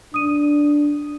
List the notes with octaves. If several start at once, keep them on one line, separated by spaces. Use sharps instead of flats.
D4 D#6 D#7